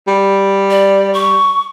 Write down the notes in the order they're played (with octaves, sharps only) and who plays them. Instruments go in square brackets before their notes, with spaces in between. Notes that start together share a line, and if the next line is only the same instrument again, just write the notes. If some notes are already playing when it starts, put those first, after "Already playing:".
[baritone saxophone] G3
[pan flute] D5
C#6